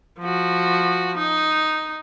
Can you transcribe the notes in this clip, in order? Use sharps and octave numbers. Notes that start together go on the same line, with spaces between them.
F3 F#4
D#4